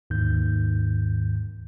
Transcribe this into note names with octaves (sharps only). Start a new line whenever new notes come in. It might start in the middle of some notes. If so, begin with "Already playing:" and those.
D#2 G#2 D#3 G6